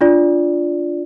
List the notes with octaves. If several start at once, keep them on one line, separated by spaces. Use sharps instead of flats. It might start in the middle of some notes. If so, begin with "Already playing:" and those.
D4 F4 D5